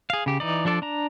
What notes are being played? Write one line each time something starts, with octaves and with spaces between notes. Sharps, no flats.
G#4 F5
C#3 G4
E3 D#4 D5
F3 D4 A4 D5
D4 A#5